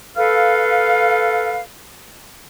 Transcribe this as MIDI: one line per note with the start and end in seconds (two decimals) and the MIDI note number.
0.17 1.61 69
0.17 1.61 71
0.17 1.61 77